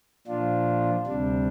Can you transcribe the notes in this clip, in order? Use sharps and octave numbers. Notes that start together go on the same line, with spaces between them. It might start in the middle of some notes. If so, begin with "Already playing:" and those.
A#2 F3 D4 F4
D2 C3 G3 D4